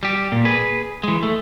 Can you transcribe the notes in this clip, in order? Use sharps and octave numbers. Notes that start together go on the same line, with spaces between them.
G3 G4
A#2
G#4 B4
E3 G#3
A3